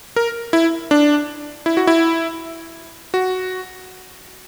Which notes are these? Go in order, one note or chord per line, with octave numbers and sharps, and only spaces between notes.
A#4
E4
D4
E4
F#4
E4
F#4